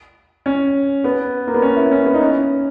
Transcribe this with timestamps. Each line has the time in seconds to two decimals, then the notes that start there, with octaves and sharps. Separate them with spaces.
0.46 C#4
1.04 B3
1.47 A#3
1.54 B3
1.62 C#4
1.77 E4
1.91 C#4
2.06 B3
2.14 D#4
2.21 C#4